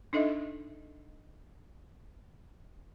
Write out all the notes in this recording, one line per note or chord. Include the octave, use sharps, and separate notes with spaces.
D4 D#4 A4 D#5 E5